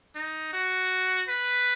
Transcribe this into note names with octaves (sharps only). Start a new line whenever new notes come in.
D#4
F#4
B4